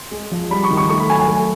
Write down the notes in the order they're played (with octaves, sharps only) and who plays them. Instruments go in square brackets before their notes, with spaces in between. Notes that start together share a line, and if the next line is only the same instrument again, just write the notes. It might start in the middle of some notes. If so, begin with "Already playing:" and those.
Already playing: [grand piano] C6
G#3
F3
G3 B5
C#6
D#3
C#6
A3 C#6
B5
F#3 G#5
G#5
A3